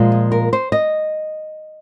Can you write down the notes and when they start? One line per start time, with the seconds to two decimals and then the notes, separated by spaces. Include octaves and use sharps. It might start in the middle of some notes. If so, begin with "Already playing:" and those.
Already playing: A#2 F3 G#3
0.12 G#4
0.32 A#4
0.53 C5
0.72 D#5